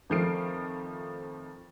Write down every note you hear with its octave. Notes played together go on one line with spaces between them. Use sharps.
F2 D#3 F3 A3 C7 D7